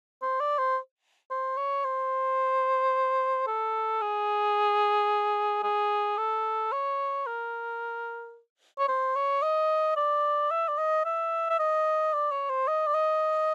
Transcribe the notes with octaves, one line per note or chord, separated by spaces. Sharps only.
C5
D5
C5
C5
C#5
C5
A4
G#4
G#4
A4
C#5
A#4
C#5
C5
C#5
D#5
D5
E5
D5
D#5
E5
E5
D#5
D5
C#5
C5
D#5
D5
D#5